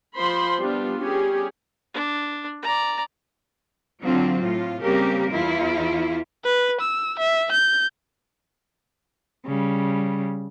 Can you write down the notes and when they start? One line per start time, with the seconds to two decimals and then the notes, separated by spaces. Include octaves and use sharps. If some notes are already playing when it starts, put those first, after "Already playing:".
0.16 F3 C5 B5 C6
0.59 G3 B3 D4 F4
0.99 G3 C#4 G4 G#4
1.94 D4
2.63 D5 A#5
4.02 D3 F#3 C4 F4
4.39 A2 F4
4.81 C#3 G3 A#3 C4 G4 A#4
5.31 E2 E4 F4
6.44 B4
6.81 E6
7.19 E5
7.52 G6
9.46 C#3 G3